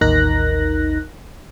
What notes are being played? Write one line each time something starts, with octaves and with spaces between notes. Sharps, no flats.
A1 D#2 D#4 A#4 F#6 A#6